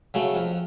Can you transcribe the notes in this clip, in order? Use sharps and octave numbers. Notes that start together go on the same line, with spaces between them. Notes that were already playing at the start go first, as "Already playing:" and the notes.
C#3 F#3 A3
F2